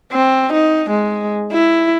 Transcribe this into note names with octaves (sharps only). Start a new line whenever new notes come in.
C4
D#4
G#3
E4